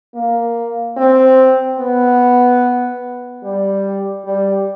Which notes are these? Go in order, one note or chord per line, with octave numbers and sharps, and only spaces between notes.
A#3
C4
B3
G3
G3